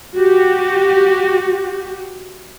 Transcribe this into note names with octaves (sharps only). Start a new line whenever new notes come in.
F#4 G4